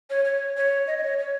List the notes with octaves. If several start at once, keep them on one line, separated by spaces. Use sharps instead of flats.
C#5
C#5
C#5
D#5
D#5
C#5
C#5